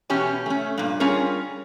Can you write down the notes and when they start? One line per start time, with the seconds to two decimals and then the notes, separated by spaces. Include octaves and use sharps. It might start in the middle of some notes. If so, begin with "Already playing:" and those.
0.10 E2 B2 C#4 G4 C#5 G#5
0.46 A3 C#4
0.78 G2 A#2
1.00 G3 C#4 F4 G#4 A#4 C#5